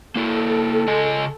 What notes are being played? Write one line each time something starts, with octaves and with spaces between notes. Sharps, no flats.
A#3 E4 A4
C#3 D#5 G#5